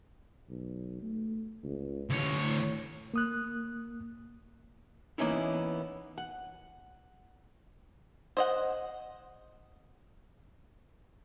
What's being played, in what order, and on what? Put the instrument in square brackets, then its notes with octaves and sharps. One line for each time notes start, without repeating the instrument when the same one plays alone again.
[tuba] B1
A3
C#2
[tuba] A1 [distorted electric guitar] D2 C#5
[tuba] A2
[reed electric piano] A#3 D#6 F#6
[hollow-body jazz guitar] E3 A#3 B3 C#4 D#4 E4
F#5
[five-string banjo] C5 D#5 F#5